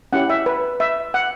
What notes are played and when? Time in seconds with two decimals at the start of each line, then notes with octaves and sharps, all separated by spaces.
0.13 C#4 E4 G4 F#5
0.30 E5
0.46 B4
0.80 E5
1.14 F#5